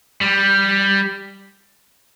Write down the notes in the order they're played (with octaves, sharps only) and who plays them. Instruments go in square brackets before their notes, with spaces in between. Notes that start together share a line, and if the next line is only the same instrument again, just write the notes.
[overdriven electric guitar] G3